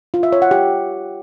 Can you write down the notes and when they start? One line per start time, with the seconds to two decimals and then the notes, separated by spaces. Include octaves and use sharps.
0.14 F4
0.23 E5
0.32 C#5
0.42 F#5
0.51 G4